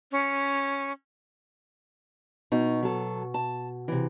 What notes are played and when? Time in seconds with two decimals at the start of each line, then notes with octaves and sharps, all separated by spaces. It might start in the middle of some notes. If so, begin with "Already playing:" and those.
0.12 C#4
2.52 B2 D#4
2.83 F#3 A4
3.34 A5
3.88 C3 E3